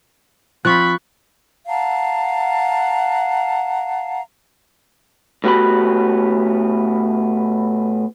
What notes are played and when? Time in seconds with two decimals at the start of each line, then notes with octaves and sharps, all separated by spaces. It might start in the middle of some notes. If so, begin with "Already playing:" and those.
0.65 F3 C4 F4 B5 C#6 F#6
1.68 F5 F#5 A5 A#5
5.44 A2 B3 F#4 G4 B5